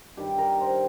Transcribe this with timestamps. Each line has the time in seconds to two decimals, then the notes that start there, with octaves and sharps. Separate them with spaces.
0.17 G2 D#3 G4
0.38 A#4
0.60 C5